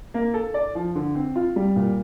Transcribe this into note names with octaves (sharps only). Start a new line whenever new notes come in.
A#3
A4
D5
F3
D3
C4
F4
G3
A#2